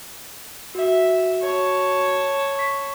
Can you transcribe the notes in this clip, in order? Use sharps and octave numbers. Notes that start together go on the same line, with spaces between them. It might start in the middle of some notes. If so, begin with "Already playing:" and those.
F#4 E5
C#5 A5
C#6 B6